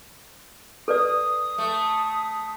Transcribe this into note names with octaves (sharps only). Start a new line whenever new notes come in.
A4 B4 D5 D#6
A3